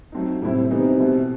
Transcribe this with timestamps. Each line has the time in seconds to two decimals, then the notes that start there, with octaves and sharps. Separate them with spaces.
0.12 F#3 A3 C4 D#4
0.41 A2 C3 G3 C4 E4
0.70 C3 E3 G3 B3 D#4
0.99 B2 A3 C4 E4